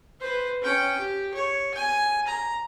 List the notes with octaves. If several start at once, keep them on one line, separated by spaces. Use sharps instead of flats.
B4 C5
C#4 G5
G4
C#5
G#5
A#5